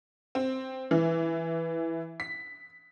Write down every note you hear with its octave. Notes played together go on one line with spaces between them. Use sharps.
C4
E3
B6